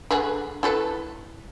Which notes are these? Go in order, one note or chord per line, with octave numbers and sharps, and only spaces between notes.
D3 G#4 B4
E4 A4 B4